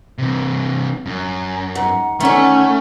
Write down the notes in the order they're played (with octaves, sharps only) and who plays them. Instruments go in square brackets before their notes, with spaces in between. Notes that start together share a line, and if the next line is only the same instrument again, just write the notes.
[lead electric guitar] C3 E3
F#2
[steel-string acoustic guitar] G#2 [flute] F#5
[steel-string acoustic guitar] D3 D#3 [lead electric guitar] A3 [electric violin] C#4 [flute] F#5